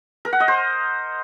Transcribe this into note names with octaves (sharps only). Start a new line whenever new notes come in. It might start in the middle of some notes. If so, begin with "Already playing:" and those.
A#4
F#5
D#5
C5